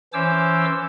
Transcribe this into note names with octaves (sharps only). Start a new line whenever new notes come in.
E3 C#4 C5 C#5 D6 E6